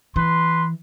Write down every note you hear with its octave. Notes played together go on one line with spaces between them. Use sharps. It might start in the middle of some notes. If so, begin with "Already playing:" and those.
E3 B4 C6